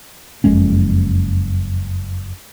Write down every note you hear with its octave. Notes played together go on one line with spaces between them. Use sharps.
F#1 F2 G#3 C#4